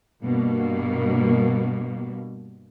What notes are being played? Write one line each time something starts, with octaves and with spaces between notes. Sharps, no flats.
G2 B2 A#3